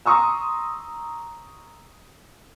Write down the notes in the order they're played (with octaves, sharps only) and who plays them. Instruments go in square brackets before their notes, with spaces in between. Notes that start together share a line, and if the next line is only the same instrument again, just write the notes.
[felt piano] A#5 C6 C#6 D#6 E6